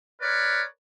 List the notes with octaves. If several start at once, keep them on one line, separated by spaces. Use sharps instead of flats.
A#4 B4 C#5 D5